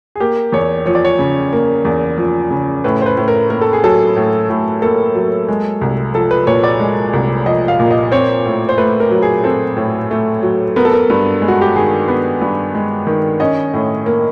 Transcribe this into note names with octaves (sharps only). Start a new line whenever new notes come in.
G#4
A#3 G4
E2 C#5
F3 C#5
D5
C#5
C#3
A#3
E2
F3
C#3
A2 B4
C5
B4
A2
A#4
A#3 A#4
A4
G#4
F#3 A4
A2
A2
A#3 A4
F#3
G#3
C2
F3 A4
B4
A#2 C#5
D5
G#3
C2
F3 D#5
F5
A#2
D#5
C4 C#5
A2
C5
A3 B4
A#4
F#3
G#4
C4 A4
A2
A3
F#3
B3 A#4
A4
A#4
G2
G#3
F#4
G4
D#3 G#4
B3
G2
G#3
D#3
C#4 D#5
A2
A#3